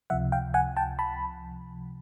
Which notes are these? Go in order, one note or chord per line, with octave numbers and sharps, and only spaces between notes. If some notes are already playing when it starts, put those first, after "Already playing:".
C#2 C3 F3 E5 F#5
F5 G5
F#5 G#5
G5 A5
A5 B5